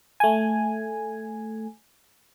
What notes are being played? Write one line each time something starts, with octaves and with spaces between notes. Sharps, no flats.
A3 G#5